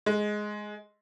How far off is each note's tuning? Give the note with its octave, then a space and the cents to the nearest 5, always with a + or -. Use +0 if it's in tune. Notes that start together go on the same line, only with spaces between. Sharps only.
G#3 +10